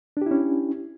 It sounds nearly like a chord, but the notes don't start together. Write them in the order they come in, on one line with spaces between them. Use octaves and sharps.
D4 G4 E4 C#4